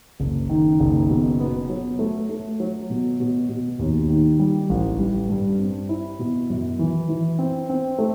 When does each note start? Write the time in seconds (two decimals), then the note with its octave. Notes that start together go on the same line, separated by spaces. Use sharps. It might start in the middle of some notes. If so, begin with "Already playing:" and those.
0.20 F#1
0.49 D#3
0.80 F#1
1.10 B2
1.40 B3
1.70 F#3
1.99 A3
2.29 A3
2.60 F#3
2.90 B2
3.20 B2
3.49 B2
3.79 D#2
4.10 D#3
4.39 G3
4.69 A1
4.99 G3
5.29 G2
5.59 C4
5.89 E4
6.19 B2
6.50 F#2
6.79 E3
7.09 E3
7.39 C4
7.70 C4
7.98 A3